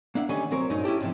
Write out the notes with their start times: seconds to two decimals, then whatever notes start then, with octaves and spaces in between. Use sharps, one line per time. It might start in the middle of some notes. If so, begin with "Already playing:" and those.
0.15 A#3 D4 E5 F#5
0.29 D3 D#3 G3 C#4 G#5
0.51 C2 F#3 C4 A#4 C#5
0.70 G2 A#2 C#4 D#4
0.84 C#4 E4 G4 A4
1.00 G#2 C3 F3